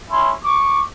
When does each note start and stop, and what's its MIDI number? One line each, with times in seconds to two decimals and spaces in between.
0.10 0.31 61
0.10 0.31 64
0.10 0.31 84
0.44 0.79 85
0.44 0.79 86